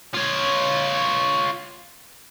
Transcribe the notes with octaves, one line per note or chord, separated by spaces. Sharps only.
F4 C#5